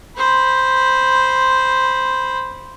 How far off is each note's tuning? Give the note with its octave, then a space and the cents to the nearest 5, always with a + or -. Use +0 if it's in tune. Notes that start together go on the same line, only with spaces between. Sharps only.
C5 +0 B5 -15